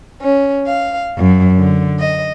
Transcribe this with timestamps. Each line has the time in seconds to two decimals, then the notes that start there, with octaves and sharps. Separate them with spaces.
0.21 C#4
0.67 F5
1.15 F#2
1.58 D3
1.99 D#5